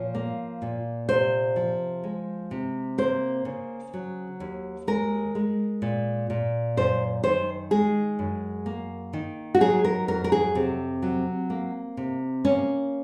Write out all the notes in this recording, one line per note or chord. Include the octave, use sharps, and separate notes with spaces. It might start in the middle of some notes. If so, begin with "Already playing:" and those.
Already playing: A#2 F3 C#5
A#3
A#2
C3 C5
F3
G#3
C3
A#3 C5
C#3
F#3
D#2
G#3 A#4
G#3
A#2
A#2
F#2 C5
D#3 C5
G#3 G#4
F#2
A#3
D#3
F#4
F#3 G#4
A#4
F2 A#4
A#4
G#4
C3 C4
F#3
A#3
C3
A#3 C#4